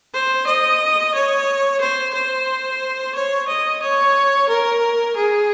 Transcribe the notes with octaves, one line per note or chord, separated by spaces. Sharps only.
C5
D#5
C#5
C5
C5
C#5
D#5
C#5
A#4
G#4